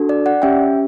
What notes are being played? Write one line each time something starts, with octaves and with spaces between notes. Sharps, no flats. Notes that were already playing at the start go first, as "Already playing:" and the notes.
Already playing: D4 F#4 A4
D5
D5 F#5
C#4 G4 E5 G5